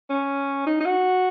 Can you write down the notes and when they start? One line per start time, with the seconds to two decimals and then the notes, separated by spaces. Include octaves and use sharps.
0.10 C#4
0.67 D#4
0.81 D#4
0.85 F#4